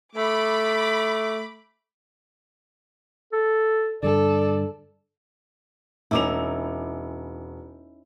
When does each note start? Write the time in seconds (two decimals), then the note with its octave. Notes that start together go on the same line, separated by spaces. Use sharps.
0.16 A3 B5 D6
3.32 A4
4.03 G2 D3 A4 D5
6.11 E1 C#4 D#4 E4 D6 F7